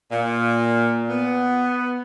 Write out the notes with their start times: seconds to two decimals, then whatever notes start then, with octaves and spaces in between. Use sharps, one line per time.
0.11 A#2
1.10 B3